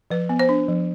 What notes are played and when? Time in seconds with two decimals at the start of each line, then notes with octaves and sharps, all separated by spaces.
0.11 F3 B4
0.29 B3
0.39 C5
0.49 D4
0.68 F3